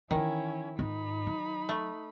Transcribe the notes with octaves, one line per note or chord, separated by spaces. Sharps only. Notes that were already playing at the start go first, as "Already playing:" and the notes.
D#3 E3 C#4 D#4 E4
G#2 D#4 F4 B5
F#3
A3